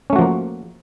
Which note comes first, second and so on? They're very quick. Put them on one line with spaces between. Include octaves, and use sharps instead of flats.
C#4 A3 F#4 F3 A#3